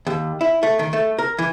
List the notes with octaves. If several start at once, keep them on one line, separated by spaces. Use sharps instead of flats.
D#2
E4
A3
D#3
A3
A#4
E3